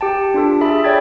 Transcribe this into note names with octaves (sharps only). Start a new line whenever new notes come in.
G4 G5 A5
D4 F4 A4
G#4 E5 A5 B5
C#5 D5 G5 B5 G#6 A6